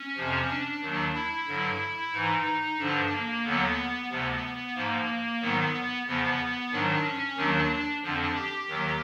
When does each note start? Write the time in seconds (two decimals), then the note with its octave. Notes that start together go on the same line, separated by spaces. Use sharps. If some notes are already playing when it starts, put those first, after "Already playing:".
Already playing: C#4
0.17 F2 C3 F3
0.49 D4
0.82 D#2 D#3 F#3
1.15 E4
1.47 G2 D3 F#3
2.13 G#2 E3 D#4
2.78 G2 D3 F3 D4
3.11 A#3
3.44 D#2 D3 F#3 B3
4.10 D2 C3 F3
4.75 G#2 F3 A#3
5.41 G#2 D#3 F#3 B3
6.06 E2 C#3 F3 B3
6.72 G#2 D#3 F#3 D4
7.05 C#4
7.37 D#2 D#3 F#3 D4
8.03 F2 D3 F3 D4
8.36 G4
8.68 D#2 D#3 F#3